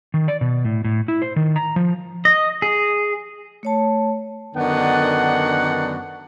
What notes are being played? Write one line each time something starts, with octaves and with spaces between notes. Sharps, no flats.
D#3
D5
B2
A2
A2
E4
C5
D#3
A#5
F3
D#5
G#4
A3 C#5 A5
F#2 D3 D#3 B3 D4 F#5